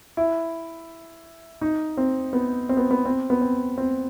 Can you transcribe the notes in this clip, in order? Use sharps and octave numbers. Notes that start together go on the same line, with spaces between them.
E4
D#4
C4
B3
C4
B3
B3
C4
B3
C4
C4